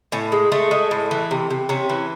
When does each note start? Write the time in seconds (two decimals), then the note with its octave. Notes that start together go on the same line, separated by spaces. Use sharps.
0.12 A2 C#4
0.32 G#3
0.52 G#3 A3
0.71 G#3
0.91 A2
1.11 E3
1.31 C3
1.50 C3
1.69 C3 C#4
1.90 E3